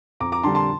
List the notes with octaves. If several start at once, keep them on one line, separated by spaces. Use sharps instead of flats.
F2 A#5 D6
A#5 D6
D3 G3 A5 C6
A5 C6